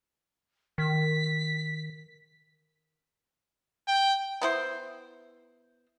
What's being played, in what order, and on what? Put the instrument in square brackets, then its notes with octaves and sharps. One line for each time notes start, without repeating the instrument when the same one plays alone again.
[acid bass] D#3 [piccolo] B6
[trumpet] G5
[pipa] B3 E4 C5